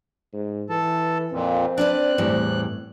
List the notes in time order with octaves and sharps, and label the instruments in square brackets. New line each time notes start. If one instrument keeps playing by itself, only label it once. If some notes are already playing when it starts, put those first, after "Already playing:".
[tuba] G#2
[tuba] E3 [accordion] A4 A5
[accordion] F2 A#2 [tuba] C4
[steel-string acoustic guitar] D4 B4 D5 [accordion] F#6
[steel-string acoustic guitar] E2 A2 G3